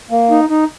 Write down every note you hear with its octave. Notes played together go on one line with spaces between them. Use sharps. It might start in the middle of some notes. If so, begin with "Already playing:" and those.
A#3
D#4
D#4